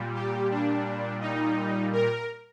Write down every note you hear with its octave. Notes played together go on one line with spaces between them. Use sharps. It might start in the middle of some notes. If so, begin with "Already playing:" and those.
Already playing: A#2 G3
G4
D4
D#4
A#4